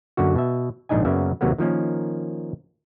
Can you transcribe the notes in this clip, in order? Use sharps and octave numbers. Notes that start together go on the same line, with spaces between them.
F#2 D3 A#3 F#4
B2 E5
A#1 G#2 D4 D#4 D#5 G#5
F#2 C#3 A#3 B3 D5 E5
D#2 C3 F#3 A#3 B3
D#3 F3 A#3 C#4